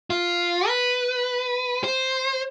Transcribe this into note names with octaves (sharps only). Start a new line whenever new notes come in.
F4
B4
C5